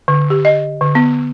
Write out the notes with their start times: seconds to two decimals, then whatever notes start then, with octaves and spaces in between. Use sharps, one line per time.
0.08 D3
0.30 G4
0.45 D#5
0.81 D3
0.95 B3